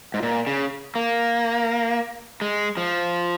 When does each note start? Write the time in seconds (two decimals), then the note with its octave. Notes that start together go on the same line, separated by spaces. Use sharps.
0.14 G#2
0.23 A#2
0.47 C#3
0.95 A#3
2.41 G#3
2.77 F3